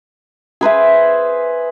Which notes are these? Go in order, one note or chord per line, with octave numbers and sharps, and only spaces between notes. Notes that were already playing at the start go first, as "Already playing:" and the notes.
G#4 B4 C5 E5